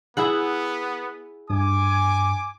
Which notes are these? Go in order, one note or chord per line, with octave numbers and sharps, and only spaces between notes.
B3 E4 G#4 F#5
G2 G#5 D6